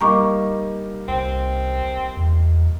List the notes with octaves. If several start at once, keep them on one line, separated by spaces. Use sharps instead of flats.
G3 A#3 D#4 A#5 C#6 D6
C2 C4
E2